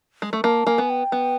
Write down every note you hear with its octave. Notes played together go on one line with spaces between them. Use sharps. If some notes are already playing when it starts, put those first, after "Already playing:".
G#3
A3
A#3 A5
A#3 G#5
B3
G5
B3